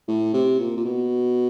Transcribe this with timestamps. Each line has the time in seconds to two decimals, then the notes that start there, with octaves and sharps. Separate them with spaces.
0.08 A2
0.33 C3
0.59 A#2
0.77 A#2
0.85 B2